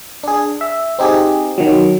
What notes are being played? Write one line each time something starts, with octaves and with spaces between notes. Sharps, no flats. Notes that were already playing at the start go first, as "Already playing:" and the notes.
D4 G#4
E5
C4 D#4 G4 G#4
D#3 F#3